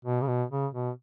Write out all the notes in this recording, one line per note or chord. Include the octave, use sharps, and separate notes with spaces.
B2
C#3
B2
C#3
B2